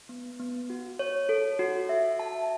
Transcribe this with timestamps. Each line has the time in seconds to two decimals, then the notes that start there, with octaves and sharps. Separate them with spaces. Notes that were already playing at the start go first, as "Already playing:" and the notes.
0.09 B3
0.40 B3
0.70 F#4
0.99 C#5
1.29 A4
1.59 F#4
1.89 E5
2.19 A5